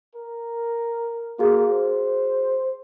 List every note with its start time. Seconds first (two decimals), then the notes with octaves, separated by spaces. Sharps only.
0.15 A#4
1.39 A#3 F#4 G#4
1.72 C5